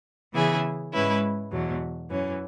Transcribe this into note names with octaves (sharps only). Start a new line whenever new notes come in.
C#3 E3 B3 E4 G#4
G#2 G#3 C#4 E4 B4
E2 B2 F#3
F#2 E3 C#4